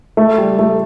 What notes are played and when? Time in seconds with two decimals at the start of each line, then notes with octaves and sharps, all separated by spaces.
0.17 A3
0.38 G3
0.59 A3